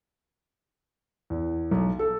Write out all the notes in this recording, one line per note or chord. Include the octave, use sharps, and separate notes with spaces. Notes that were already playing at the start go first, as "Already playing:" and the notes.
E2
B1
A4